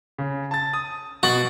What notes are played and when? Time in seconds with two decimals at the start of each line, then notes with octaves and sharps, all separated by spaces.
0.18 C#3
0.51 A5 A6
0.73 D#6
1.23 B2 F#4 A6 F#7